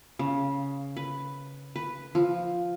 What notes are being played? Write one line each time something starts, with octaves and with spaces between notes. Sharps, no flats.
C#3
B4
B4
F3